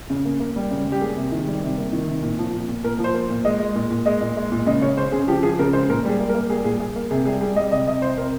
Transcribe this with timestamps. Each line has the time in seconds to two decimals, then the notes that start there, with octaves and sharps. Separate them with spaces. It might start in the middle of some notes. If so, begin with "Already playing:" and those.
0.10 C#3
0.25 A#3
0.40 A#3
0.56 G3
0.71 C#3
0.86 G3
0.92 G4
1.01 A#3 G#4
1.16 C3
1.32 D#3
1.47 G3
1.63 C3
1.77 A#3
1.93 D#3
2.07 C3
2.22 A#2
2.39 F3
2.53 A#2
2.68 A#2
2.84 A#2 A#4
2.99 F3
3.04 C5
3.14 A#3
3.30 A#2
3.45 G#3 D#5
3.60 G#3
3.75 A#2
3.90 A#2
4.06 G#3 D#5
4.21 A#2
4.37 G#3
4.52 A#2
4.66 C#3 D#5
4.82 C#3 C#5
4.97 C#3 C5
5.12 C#3 G#4
5.28 F3 G4
5.43 F3 G#4
5.59 C#3 A#4
5.73 G#3 C5
5.89 A#2 A#4
6.05 G3 G#4
6.20 A#3
6.29 A#4
6.34 A#3
6.50 G3 G#4
6.64 A#2 G#4
6.80 A#3 G#4
6.96 A#3
7.11 C3 G#4
7.25 G3 G#4
7.41 G3 G#4
7.56 G3 D#5
7.71 C3 D#5
7.87 C3 D#5
8.02 C3 C5
8.17 C3 A#4